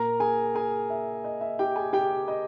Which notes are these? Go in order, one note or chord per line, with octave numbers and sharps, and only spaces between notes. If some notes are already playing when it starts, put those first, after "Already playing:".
Already playing: A#2 A#4 A#5
G#4 G#5
G#4 G#5
E5
D#5
E5
G4 G5
G#4 G#5
G4 G5
D#5